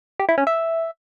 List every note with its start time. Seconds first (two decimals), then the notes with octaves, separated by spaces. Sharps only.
0.19 G4
0.29 E4
0.38 C#4
0.47 E5